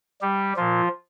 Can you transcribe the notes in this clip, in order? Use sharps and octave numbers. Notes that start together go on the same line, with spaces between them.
G3 G4
A#2 F3 F4